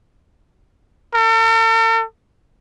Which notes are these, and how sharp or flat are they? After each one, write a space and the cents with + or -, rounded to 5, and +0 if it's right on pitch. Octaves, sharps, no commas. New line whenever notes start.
A4 +45